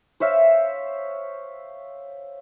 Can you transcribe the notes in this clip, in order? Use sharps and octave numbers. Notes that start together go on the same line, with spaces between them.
C5 C#5 E5 F5